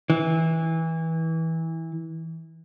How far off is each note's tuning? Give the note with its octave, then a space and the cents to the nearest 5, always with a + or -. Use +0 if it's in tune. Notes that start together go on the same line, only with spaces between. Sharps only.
E3 -20